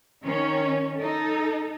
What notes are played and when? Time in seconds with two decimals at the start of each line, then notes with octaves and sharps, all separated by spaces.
0.24 D#3 C#4
0.96 D#4 A4